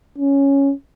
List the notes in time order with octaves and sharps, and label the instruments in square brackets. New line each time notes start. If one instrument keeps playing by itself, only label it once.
[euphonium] C#4